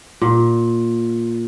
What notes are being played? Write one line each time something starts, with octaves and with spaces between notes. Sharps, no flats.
A#2